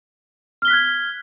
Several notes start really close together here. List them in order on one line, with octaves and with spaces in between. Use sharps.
F6 G7 B6 F#6 G#6